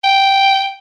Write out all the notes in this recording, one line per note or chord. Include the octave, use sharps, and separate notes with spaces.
G5